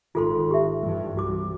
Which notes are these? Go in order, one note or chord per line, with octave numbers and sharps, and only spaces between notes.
G#1 D#3 F4 A4 C6
G4 E5
G2 E3 G3
C2 F#4 D6